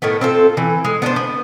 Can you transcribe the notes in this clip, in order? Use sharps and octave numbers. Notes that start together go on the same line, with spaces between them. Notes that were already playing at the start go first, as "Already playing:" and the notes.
A2 D#3 A3 B3
C4 F4 A4
E3
G#3
B3 D4 A#4 C5
B3